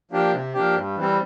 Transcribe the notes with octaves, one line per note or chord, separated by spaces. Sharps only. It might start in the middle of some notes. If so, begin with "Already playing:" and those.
F3 A#3 D4 G4
C3
F3 A#3 D4 G4
G2
E3 G3 C4